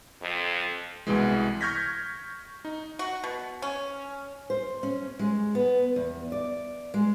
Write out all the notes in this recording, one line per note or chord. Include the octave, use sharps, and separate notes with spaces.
F2
C2 B2 E3 G#3
C#6 F6 G6 G#6 A#6 B6
D#4
F#4
B2
C#4
C5
C#4
G#3
B3
E2
D5
G#3